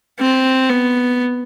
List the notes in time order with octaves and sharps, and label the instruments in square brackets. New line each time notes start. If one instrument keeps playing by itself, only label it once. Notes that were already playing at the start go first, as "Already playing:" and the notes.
[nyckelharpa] C4
B3